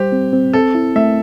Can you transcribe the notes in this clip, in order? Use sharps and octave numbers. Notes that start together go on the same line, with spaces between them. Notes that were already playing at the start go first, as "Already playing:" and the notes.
Already playing: G3 G4 C5
C4
C4
C4 A4
E4
A3 E5